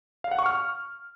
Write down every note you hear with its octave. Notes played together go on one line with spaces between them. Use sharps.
F5
F#5
C#6
F6
C#6